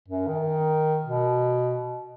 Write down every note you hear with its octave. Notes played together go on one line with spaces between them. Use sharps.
F#2
D#3
B2